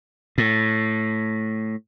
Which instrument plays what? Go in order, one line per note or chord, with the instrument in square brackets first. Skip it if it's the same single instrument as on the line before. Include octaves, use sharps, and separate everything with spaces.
[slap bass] A2